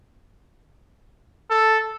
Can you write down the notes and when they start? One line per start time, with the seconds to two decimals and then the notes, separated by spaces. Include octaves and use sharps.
1.50 A4